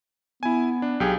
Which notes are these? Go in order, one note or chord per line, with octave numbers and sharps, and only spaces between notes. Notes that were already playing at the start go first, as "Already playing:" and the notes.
B3 E4 G#5
D4
B1 G4 G#4